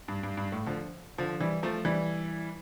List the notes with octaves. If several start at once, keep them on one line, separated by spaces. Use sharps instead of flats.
G2
G2
G2
A2
D3 F3
D3 F3
E3 G3
F3 A3
E3 G3